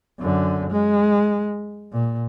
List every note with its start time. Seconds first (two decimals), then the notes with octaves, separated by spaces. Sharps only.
0.19 F#2 D3
0.70 G#3
1.93 A#2